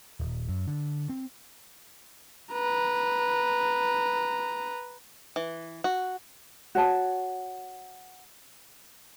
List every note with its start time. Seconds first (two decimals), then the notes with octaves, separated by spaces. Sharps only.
0.20 D#1
0.48 F#2
0.67 D3
1.10 C4
2.52 B4 A#5
5.36 E3
5.84 F#4
6.75 F#4 C#5 A5